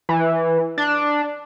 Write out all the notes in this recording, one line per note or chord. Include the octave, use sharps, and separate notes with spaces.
E3
D4